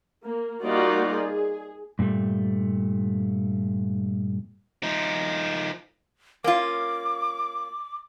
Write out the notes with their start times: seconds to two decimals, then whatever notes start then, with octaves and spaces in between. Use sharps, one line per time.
0.24 A#3
0.64 G3 A#3 D#4 F4 F#4 D5
1.15 G#4
1.99 G2 A#2 D3 G3 A3
4.83 F3 D#4
6.44 A#3 C#4 F4 D6